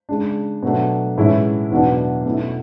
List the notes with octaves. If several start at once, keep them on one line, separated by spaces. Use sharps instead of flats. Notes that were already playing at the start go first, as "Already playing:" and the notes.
C#3 G#3 D4
B2 F#3 A3 D4
A2 E3 G#3 C#4 E4
E2 B2 F#3 B3 D4
B2 A3 C#4 E4